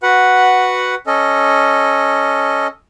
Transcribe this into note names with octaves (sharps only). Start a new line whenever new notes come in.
F#4 B4 F#5
C#4 A4 D#5